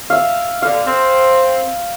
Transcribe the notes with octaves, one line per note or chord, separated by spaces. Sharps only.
E5 F5
B2 D3 F5
C4